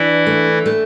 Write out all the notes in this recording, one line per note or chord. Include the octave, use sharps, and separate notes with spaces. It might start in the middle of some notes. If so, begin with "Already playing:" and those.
Already playing: E3 D4 E4
A3
A3